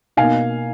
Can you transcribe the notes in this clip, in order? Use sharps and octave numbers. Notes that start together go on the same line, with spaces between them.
B2 A#3 D#4 F5 G#5